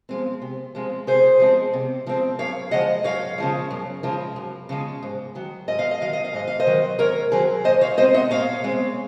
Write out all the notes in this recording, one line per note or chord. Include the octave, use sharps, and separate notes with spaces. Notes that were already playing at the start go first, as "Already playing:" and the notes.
F3 G#3 C4
C3
F3 G#3 C4
C3 G#4 C5
F3 G#3 C4
C3
F3 G#3 C4
F#2 C#5 F5
C#3 F3 G#3 D#5 F#5
F#2 C#5 F5
C#3 F3 G#3
F#2
C#3 F3 G#3
F#2
C#3 F3 G#3
G#2
D#3 F#3
G#2 D#5
F5
D#5
D#3 F#3 F5
D#5
F5
G#2 D#5
F5
C5 D#5
D#3 F#3
G#2 A#4 C#5
D#3 F#3 G#4 C5
A#2 C5 D#5
C#5 F5
G#3 C4 C5 D#5
D#5 F#5
A#2 C#5 F5
G#3 C4